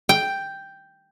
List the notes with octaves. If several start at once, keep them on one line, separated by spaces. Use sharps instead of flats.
G5